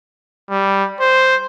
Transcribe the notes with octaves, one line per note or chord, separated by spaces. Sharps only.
G3
C5